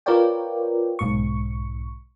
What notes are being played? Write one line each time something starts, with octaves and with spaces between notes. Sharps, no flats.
F4 A#4 B4 C#5 D5 G5
B1 G#2 C#6